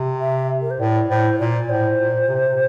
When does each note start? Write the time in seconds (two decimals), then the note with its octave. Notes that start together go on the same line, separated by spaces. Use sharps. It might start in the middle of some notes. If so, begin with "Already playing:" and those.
Already playing: C3
0.21 E5
0.62 A#4
0.70 C5
0.80 A2 D5
1.09 A2 C5
1.39 A#2 D5
1.69 A2 C5
1.99 A#2
2.28 C3